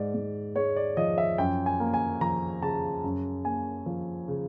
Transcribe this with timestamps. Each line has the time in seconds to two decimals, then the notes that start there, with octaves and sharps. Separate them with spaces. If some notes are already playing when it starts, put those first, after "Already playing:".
Already playing: G#2 D5
0.14 G#2
0.56 G#3 C#5
0.76 D5
0.97 F3 D#5
1.18 E5
1.38 F#2 G5
1.66 G#5
1.80 A#3
1.94 G#5
2.21 F3 A#5
2.62 C#3 A5
3.04 F#2
3.45 A#3 G#5
3.86 F3
4.28 C#3